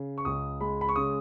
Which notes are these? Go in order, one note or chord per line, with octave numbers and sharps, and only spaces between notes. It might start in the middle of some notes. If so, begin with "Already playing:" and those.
Already playing: C#3
C#6
C#2 D#6
G#3 B5
B5
C#6
C#3 D#6